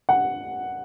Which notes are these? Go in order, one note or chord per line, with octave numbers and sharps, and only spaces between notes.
F#5